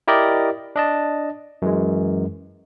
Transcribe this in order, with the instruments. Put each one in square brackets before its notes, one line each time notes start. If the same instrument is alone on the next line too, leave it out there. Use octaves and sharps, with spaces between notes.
[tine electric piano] E4 G4 A#4 D5 D#5
D4 D#5 A5
F#2 E3 G#3